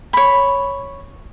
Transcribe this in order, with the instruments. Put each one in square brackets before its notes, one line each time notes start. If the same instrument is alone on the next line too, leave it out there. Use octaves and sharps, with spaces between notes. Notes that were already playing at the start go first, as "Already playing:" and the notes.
[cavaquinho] C#5 B5